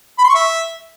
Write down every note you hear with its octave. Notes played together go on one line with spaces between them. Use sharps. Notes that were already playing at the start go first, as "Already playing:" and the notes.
B5
C6
C#6
E5